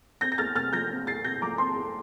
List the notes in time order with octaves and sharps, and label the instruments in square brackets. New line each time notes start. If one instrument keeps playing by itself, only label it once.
[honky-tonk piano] C4 G6 A#6
A#6
E2 F6 A6
C3 F6 A6
F3 G6 A#6
C4
E2 A6 C7
C3 G6 A#6
F3 A#5 D6
C4 A5 C6
E2